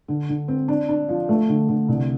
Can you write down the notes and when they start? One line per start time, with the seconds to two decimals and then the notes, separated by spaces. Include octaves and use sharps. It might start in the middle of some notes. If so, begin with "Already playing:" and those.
0.08 D3
0.29 D3
0.48 C4
0.68 D4
0.89 D4
1.09 F3
1.29 A3
1.48 D3
1.69 D3
1.88 C2